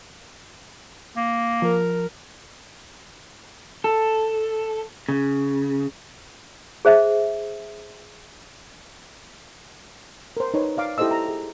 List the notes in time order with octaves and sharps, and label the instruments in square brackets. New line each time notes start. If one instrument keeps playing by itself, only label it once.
[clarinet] A#3
[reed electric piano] F3 [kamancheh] A#4
[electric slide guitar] A4
C#3
[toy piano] G#4 C5 E5
[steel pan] A#4 C5
D#4 B4 C#5
D5 F5 D6
E4 G4 A4 C5 D#5 E6
A#5
G#4